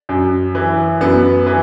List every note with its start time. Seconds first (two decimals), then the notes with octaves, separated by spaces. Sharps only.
0.09 F#2
0.55 E3
1.01 F#2 B3
1.46 E3